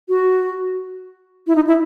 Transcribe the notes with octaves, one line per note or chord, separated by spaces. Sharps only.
F#4
E4
D#4
E4